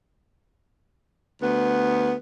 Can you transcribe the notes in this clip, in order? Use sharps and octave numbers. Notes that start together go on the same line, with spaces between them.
D2 B3